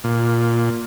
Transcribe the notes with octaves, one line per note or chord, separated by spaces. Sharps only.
A#2